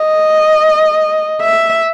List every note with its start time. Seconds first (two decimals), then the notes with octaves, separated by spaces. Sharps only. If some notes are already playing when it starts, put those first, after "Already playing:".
Already playing: D#5
1.41 E5